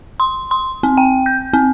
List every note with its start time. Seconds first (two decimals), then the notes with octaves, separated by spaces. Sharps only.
0.20 C6
0.51 C6
0.83 C4
0.97 G5
1.26 G6
1.53 C4